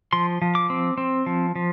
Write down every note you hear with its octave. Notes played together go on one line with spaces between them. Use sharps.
F3 C6
F3
D6
C4
C4
F3
F3